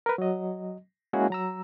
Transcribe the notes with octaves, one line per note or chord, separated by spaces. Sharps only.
A#4 B4
F#3 D#5
G#3 A#3 C#4 E4 F#4 G#4
F#3 A#5 E6